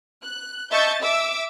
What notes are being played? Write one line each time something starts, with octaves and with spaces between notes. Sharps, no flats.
F#6
D#5 E5 A5 C#6 G6 A6
E5 D6 E6